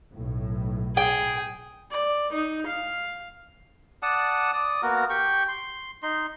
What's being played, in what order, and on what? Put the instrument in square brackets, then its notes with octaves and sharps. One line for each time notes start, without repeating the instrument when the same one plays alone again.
[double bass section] B1 A2
[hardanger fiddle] G#4 [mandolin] G5
[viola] D5
D#4
F5
[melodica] D5 F#5 A5 D#6
D5 D#6
A#3 B3 F#4 A#4
G4 G5 C#6
C6
D#4 C6